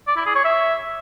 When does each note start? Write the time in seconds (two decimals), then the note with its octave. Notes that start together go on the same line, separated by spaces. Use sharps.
0.07 D5
0.17 E4
0.26 G#4
0.35 C#5
0.45 E5